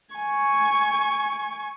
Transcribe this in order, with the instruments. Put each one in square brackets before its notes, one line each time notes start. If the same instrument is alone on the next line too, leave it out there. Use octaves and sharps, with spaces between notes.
[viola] G#5 C#6